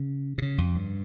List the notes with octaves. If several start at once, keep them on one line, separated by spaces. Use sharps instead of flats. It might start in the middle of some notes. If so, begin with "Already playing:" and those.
Already playing: C#3
C3
C#3
F2
G2